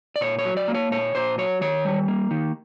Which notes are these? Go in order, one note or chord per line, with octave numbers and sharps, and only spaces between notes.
D5
A#2 C#5
C#5
F#3
D5
A#3
C#5
A#2 C#5
A#2 C5
F#3 C#5
D#3 C#5
G3
A#3
D#3